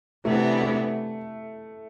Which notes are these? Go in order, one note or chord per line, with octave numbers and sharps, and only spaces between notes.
C3 E3 A3 B3 D4
A3